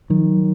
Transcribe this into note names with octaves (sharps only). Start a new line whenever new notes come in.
D#3 F#3
F3
F#3